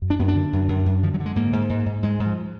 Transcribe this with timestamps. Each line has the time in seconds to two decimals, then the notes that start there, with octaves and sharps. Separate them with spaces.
0.02 F#2
0.10 D4
0.19 F#2 B3
0.28 D4
0.35 D3
0.53 F#2
0.68 F#2
0.86 F#2
1.03 D3 F3
1.14 F#3
1.20 D3
1.26 G#3
1.36 G#2 A#3
1.53 G#2
1.70 G#2
1.86 G#2
2.03 G#2 G#3
2.20 G#2
2.26 F3